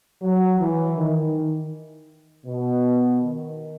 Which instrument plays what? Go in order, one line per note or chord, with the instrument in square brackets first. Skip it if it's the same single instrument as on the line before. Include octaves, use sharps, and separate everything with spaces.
[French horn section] F#3
E3
D#3
B2
D#3